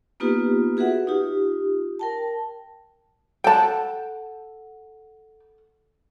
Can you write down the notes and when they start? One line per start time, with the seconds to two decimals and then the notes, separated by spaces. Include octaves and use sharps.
0.20 A#3 B3 D#4 F4 G4 B4
0.77 F#4 G#4 B4 E5 F#5
1.07 D#4 F4 G4
1.99 A#4 G5 A5
3.44 A4 F#5 G5 A5